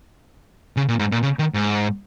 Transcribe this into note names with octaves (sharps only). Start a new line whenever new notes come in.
C#3
A#2
G#2
A#2
C#3
D#3
G#2